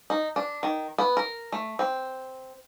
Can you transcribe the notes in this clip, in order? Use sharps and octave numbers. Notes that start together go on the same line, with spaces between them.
D#4
D4
D#3
B3
A#4
A3
C4